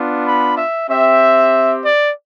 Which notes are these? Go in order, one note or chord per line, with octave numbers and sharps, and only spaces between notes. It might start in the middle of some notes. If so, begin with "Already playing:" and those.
Already playing: B3 D4 F4
B5
E5
C4 G4 E5
D5